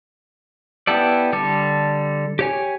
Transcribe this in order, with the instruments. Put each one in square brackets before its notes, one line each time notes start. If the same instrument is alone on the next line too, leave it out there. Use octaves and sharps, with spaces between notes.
[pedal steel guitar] B3 E4 G4 A4 D5
D3 G3 A4 D6
G4 C#5 G#5